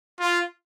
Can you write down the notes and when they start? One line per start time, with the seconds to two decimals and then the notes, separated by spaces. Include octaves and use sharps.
0.20 F4